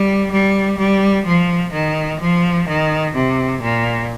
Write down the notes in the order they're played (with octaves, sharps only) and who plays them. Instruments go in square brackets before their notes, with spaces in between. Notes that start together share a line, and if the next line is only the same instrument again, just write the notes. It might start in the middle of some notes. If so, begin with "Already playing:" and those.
Already playing: [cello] G3
G3
G3
F3
D#3
F3
D#3
C3
A#2